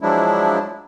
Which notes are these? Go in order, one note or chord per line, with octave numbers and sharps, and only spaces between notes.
F3 F#3 G#3 D4 E4